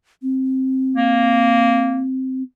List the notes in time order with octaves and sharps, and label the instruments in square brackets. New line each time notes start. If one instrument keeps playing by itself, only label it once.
[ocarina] C4
[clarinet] A#3